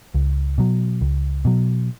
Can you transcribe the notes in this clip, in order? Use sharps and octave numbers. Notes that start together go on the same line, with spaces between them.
C#2
B2 F#3
C#2
B2 F#3